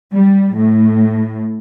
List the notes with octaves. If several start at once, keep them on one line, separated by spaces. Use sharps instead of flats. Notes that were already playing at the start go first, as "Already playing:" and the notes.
G3
A2